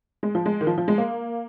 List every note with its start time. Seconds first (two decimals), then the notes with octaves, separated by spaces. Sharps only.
0.23 G#3
0.35 F3
0.46 G#3
0.61 D#3
0.67 F3
0.78 F3
0.88 G#3
0.98 A#3